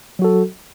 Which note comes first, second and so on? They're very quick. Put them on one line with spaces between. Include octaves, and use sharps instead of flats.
F#3 F#4 A4